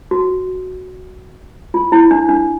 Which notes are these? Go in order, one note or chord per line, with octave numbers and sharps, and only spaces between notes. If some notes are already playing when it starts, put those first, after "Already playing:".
F#4
F4
E4
D4
D4